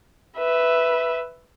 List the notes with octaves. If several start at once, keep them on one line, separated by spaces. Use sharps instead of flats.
B4 E5